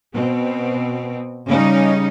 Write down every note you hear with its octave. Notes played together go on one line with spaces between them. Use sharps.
B2 C4
C#3 G3 C#4 D#4